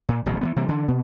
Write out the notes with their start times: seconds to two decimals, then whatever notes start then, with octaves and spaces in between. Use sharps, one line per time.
0.09 A#2
0.26 D1 A1 B2 F#3
0.41 E3 G3 B3
0.56 C3 E3 G3 A#3
0.69 D3 E3 D4
0.88 B2 B3